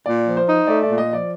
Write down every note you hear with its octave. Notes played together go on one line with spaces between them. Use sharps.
A#2 D5
F3
C5
D#4
A3 D5
D5
A#2
D#5
F3 D5